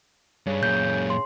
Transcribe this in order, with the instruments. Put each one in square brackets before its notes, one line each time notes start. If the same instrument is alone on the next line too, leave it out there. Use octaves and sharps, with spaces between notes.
[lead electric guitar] G2 [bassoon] C#3
[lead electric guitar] F#2 A#2 [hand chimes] G6
[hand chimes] C6